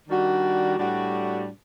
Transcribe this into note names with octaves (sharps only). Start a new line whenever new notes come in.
D#3 G3 D4 F#4
A2 G3 D4 F#4